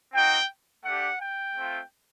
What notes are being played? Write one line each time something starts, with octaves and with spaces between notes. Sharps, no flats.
C4 D#4 F#4 G5
A3 D4 G4 F#5
G5
A3 C4 F4